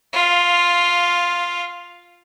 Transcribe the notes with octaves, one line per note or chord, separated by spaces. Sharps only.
F4 F5